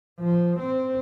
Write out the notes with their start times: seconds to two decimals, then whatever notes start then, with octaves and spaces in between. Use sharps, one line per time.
0.20 F3
0.59 C4